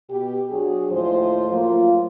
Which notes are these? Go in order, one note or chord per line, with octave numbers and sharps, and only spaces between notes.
B2 G4
F#3 D4 F#4 G#4
D#2 A2 F3 F4 C5
F#3 A3 A#3 F4